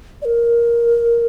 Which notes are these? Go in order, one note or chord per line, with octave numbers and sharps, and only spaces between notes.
D5
A#4